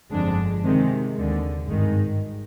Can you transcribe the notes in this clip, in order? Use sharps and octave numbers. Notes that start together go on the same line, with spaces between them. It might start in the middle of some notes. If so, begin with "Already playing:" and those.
G1 F2 D3 G#3 D4
C3 D#3 G#3
D#2 D3 G#3
G#1 G2 D#3 G#3